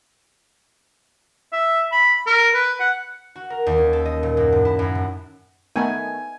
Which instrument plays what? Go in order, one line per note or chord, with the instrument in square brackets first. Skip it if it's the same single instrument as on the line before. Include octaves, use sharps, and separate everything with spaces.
[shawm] E5
B5
A#4
B4
F#5
[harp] F#4
A#4
D#2
C#4
A4
D#5
A#2
F#2
A2
E4
F#2
A2
[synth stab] D#3 A3 B3 [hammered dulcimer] G#5